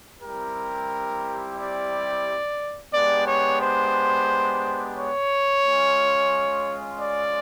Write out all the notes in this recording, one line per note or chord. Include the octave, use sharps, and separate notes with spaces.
G3 C4 E4 G4 A#4
D5
G#3 B3 D4 G4 D5
C#5
C5
C#5
G#3 C#4 F4
D5